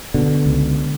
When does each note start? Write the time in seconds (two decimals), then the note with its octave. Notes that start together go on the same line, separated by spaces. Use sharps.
0.14 B2 D3
0.46 C#2